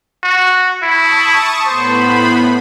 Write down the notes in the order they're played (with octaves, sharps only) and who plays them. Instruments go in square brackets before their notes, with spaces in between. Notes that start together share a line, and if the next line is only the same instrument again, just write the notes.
[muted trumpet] F#4
[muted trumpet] E4 [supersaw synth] A5 C#6 D#6
[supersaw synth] A2 B3 B5 [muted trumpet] C5